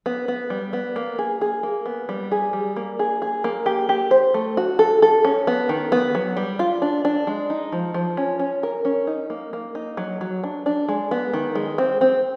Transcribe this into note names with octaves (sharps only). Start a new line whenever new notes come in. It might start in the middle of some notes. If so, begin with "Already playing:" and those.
B3
B3
G3
B3
A#3
G#4
G#4
A#3
B3
G3
G#4
G3
A#3
G#4
G#4
A#3
G4
G4
C5
A3
F#4
A4
A4
C#4
B3
D#3
B3
F#3
G3
F4
D4
D4
G#3
D#4
F3
F3
C#4
C#4
A#4
C#4
D#4
A#3
A#3
D#4
F#3
F#3
D4
D4
G#3
B3
D#3
G#3
C4
C4